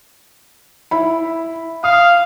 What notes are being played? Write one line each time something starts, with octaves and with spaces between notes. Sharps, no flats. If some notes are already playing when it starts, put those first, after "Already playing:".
E4 B5
F5 D#6